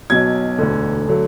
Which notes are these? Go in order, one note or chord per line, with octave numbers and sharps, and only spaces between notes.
B1 B2 F#3 G#6
E1 D2 D3
D3 F#3 A3